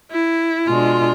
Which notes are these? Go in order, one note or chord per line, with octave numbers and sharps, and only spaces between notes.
E4
B2 G#3 D4 F4